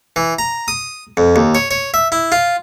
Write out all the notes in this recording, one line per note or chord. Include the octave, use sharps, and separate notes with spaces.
E3
A#5
D#6
F2
D#2
C#5
C#5
E5
E4
F4